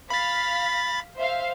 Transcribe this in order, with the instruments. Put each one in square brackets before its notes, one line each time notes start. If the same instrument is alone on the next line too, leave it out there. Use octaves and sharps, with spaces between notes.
[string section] F5 B6 [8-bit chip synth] B5 A6
[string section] C5 E5 F5